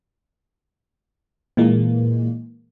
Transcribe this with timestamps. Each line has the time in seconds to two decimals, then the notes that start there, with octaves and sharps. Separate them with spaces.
1.57 A#2 E3 G#3 A#3